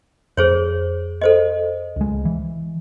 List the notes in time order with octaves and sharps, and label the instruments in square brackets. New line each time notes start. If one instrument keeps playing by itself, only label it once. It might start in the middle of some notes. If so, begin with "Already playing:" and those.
[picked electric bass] F2 [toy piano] G#4 C5 C#5
[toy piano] A4 C5 D#5
[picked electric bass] C#2 G#3
E3